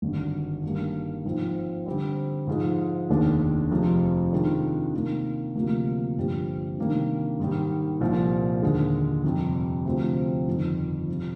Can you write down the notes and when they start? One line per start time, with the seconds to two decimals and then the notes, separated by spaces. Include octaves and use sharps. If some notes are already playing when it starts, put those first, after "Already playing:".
0.02 G#1 G2 D3
0.63 G2 D#3 G3 A#3
1.25 G#2 F3 C4
1.86 D3 G3 C4
2.47 G#2 F3 G#3
3.09 F1 D#2 D#3 G#3 D4
3.71 F1 F2 C3 F3 G#3
4.32 C3 D#3 G#3 D4 F4
4.94 C3 D#3 A#3
5.55 D2 C3 F3 A#3 F4
6.17 G1 G2 F3 C4 G4
6.78 C3 D#3 G3 A#3 D4
7.40 G#2 D#3 G3
8.00 C2 A#2 F3
8.62 D#2 D3 G#3
9.24 F2 C3 G3
9.85 D2 C3 F3 C4
10.47 G1 F2 D#3
11.08 C3 F3